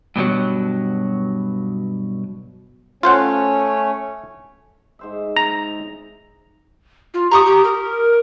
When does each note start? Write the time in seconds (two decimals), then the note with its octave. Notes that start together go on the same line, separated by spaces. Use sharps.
0.16 G2 B2 E3 F#3
3.03 A3 C#4 F4 C5 C#5 F#5
4.99 G#2 C5 E5
5.36 A#5
7.14 F4
7.31 G4 A#5 C#6 D#6
7.46 G4
7.65 A#4